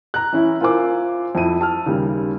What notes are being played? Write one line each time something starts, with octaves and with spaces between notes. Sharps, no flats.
A#5 F#6
E3 C#4 E4
F4 A#4 C5 G#5 D6 E6
F2 E4 D#7
A5 E6 F6
D#2 C#3 G3